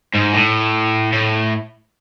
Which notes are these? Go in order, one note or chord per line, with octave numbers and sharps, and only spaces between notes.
G#2
A2
A2